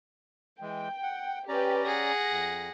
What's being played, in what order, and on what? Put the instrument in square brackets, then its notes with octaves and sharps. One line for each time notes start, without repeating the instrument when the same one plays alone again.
[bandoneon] E3 G#3 [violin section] G5
[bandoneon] F#5
[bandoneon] C#4 D5 A#5 [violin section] G4 B4
[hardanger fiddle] G#4 F#5 [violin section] A#6
[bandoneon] F2